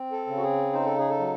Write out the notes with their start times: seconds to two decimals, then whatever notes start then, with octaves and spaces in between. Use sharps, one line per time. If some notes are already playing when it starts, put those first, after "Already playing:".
Already playing: C4
0.12 A4
0.27 C#3
0.37 F#4
0.43 G#4
0.73 D#4 C5
0.85 A4
0.98 G#4
1.10 A4
1.19 F#3